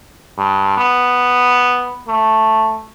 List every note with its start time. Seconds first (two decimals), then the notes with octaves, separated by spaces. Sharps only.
0.38 G2
0.77 B3
2.08 A3